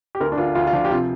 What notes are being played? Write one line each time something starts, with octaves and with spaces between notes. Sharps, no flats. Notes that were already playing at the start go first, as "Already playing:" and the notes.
G4
D2 A#4
D4
D2 F4
D2 F4
F4
F3 D4
G4
C3 F4